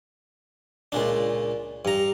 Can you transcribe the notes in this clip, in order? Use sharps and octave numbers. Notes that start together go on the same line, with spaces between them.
C#2 A#2 D4
G2 A#5